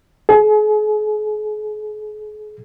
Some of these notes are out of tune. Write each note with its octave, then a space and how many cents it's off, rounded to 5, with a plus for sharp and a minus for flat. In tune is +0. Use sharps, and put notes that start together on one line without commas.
G#4 +40